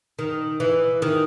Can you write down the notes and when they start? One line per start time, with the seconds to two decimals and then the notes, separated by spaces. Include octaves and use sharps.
0.19 D#3
0.60 E3
1.02 D#3